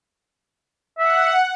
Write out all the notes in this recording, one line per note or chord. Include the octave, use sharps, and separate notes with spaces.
E5 F#5